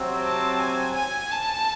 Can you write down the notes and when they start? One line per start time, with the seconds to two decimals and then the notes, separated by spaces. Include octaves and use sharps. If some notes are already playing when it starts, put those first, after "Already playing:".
Already playing: C3 F#3 C4
0.24 A5
0.59 G#5
0.95 G#5
1.31 A5